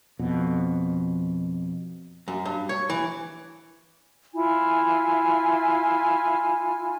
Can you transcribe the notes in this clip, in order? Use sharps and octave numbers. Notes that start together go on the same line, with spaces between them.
F2 B2
F#2
G2
C#5
E3
E4 F4 G#5